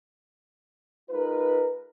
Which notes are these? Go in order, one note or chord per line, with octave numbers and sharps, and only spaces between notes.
G#3 D#4 F4 A#4 B4